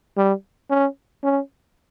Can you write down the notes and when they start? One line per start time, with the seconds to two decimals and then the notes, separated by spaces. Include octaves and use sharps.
0.17 G3
0.70 C#4
1.24 C#4